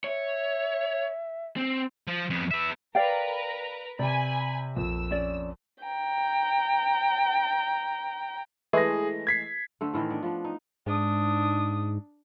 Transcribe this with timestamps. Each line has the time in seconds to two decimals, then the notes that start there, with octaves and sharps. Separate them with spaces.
0.04 C#5 E5
1.57 C4
2.08 F3
2.30 F2 B3
2.51 B3 E5
2.95 A#4 B4 D5 F5 G5 A#5
3.99 C3 D5 G#5 B5
4.76 A#1 F2 E6
5.11 C#4 D5
5.84 G5 A#5
8.73 E3 G#3 A3 G#4 A#6
9.27 G#6 B6 C7
9.81 D3 A3 C5
9.94 A2 D#3 E3
10.10 B3 D4
10.23 F3 B3
10.44 D#4
10.86 G#2 D4 D#6